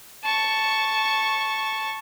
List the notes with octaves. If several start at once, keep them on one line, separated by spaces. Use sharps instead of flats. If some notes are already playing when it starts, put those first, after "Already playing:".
A5 C#6